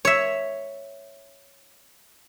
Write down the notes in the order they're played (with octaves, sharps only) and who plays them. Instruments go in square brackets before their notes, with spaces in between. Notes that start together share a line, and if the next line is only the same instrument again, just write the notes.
[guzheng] C#5 E5